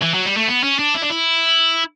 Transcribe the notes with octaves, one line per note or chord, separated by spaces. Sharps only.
E3
F#3
G3
A3
B3
C#4
D4
E4
D4
E4